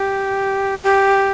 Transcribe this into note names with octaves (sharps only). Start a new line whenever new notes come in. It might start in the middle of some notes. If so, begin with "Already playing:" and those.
Already playing: G4
G4